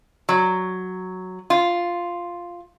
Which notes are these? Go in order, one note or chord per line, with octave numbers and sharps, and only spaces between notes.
F#3
F4